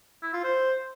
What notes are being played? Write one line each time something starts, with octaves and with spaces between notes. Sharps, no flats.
E4
F4
C5